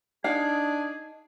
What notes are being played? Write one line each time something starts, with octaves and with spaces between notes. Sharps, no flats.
D4 D#4 G#4 F5